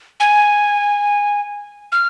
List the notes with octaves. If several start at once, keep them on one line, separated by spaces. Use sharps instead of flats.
G#5
F6